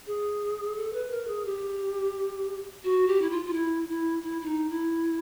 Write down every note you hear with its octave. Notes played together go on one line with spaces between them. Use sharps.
G#4
A4
B4
A#4
G#4
G4
F#4
G4
E4
F4
F4
E4
E4
E4
E4
D#4
E4